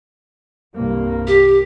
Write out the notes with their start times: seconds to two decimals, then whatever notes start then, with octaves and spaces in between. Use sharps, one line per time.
0.75 C2 G2 A#3
1.27 G4